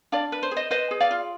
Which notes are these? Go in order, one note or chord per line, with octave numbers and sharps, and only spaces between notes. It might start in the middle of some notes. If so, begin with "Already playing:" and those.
D4 D5 F5
B4
C5
G#4
C5 D#5
B4 C5 D#5
G#4
D5 F5
F4